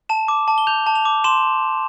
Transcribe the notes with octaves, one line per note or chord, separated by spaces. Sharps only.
A5 E7
D6
A5
G7
G6 F7
A5
F7
D6
C6 E7